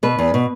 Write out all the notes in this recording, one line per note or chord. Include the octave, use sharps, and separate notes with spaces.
B2 B4
E2
B2